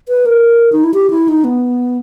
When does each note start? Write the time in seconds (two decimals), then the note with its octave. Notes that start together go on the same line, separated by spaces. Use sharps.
0.09 B4
0.26 A#4
0.72 D#4
0.84 E4
0.94 G4
1.10 E4
1.28 D#4
1.44 B3